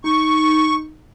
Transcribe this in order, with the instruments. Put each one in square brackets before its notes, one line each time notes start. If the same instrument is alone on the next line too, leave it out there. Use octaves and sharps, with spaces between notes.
[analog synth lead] D#4 [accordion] C#6